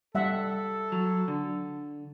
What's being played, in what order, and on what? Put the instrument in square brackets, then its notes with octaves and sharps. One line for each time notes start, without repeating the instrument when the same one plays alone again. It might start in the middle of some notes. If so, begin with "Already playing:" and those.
[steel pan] G3 E5 F#5 [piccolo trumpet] A4
[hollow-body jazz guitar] F#3
D3